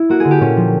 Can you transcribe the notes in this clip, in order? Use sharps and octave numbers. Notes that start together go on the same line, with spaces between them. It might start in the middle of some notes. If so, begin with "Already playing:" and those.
Already playing: E4
A#3 F#4
D3 G#4
G4
A#2 C#4
F3